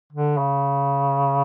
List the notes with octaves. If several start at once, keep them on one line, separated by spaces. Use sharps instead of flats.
D3
C#3